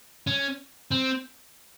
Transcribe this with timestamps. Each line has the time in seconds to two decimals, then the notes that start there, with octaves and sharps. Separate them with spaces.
0.27 C#4
0.91 C4